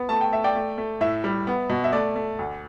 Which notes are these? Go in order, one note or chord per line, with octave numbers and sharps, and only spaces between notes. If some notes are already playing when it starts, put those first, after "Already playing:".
Already playing: B3
A3 A5
G5
A3 E5
D5 G5
A3
A3
A2 E5
G3
B3
B2
E5
A3 D5
A3
D2